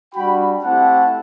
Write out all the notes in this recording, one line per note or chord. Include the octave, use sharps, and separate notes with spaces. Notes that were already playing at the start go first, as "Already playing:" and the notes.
G3 D4 F#4 G5 B5
A3 C4 E4 G4 F#5 A5